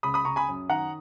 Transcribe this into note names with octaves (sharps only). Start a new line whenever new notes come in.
C#2 B5 D#6
B5 D#6
C#2 A#5 C#6
G#5 B5
F#2
D#3 F#5 A#5